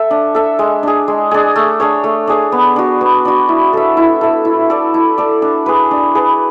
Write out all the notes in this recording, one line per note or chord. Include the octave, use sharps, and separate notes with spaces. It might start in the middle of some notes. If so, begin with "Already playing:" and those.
Already playing: A4 E5
D4
A4 E5
G#3
D4 G#4
G#3
D4 G#4
A3
D4 G#4 C#5
A3
D4 G#4 C#5
B3
D4 F#4
B3
D4 F#4
E4
A4 E5
E4
A4 E5
E4
A4 D5
E4
A4 D5
D4
G#4 B4
D4
G#4 B4